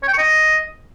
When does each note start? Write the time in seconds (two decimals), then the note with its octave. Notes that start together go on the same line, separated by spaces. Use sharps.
0.03 C#5
0.08 G5
0.13 C#6
0.18 D#5